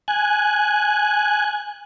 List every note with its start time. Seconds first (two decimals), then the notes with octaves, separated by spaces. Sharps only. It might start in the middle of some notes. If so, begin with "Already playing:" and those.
0.08 G#5 F#6